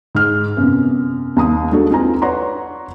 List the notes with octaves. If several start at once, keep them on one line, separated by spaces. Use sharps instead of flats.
G#2 F6
F#2 C3 B3
D#2 A#5 D#6
G#3 D4 F#4 A4
C4 D#4 F4 B4 G#5 A#5
B4 C#5 D5 F#5 A#5 C6